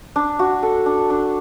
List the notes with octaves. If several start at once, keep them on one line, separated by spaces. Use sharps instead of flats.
D4
F#4
A4
D4
D4